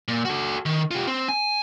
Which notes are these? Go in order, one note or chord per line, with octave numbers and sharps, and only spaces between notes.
A#2
F#4 A4
D#3
F4 G4
C4
G#5